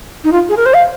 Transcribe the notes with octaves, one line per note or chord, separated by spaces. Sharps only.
D#4
F4
G#4
A#4
C5
F5